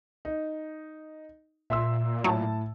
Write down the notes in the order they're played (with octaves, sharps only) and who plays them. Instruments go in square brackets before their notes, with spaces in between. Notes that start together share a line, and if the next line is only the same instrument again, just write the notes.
[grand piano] D#4
[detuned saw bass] A#2 [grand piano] E5 C6 E6
[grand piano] A2 A5 [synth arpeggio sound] F#3